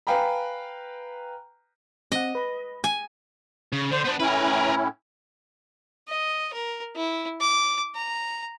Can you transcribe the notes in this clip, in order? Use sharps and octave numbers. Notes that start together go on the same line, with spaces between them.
B4 F5 G5 G#5 A#5 B5
C4 D#5 F#5
B4 B5
G#5
C#3
D3 C5
B3 D4
A2 C#4 E4 A#4 B4
D#5
A#4
E4
D6
A#5